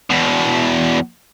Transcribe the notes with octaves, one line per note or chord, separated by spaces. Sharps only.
E2 B2